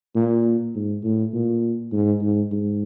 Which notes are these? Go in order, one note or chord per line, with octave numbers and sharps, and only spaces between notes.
A#2
G#2
A2
A#2
G#2
G#2
G#2